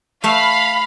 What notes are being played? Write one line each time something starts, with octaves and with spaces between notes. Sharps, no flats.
A3 E5 F5 B5